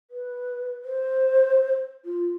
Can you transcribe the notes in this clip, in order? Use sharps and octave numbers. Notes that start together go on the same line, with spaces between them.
B4
C5
F4